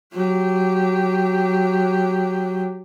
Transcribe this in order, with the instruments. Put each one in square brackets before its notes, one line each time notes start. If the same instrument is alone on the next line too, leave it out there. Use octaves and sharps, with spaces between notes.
[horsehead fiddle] F#3 G4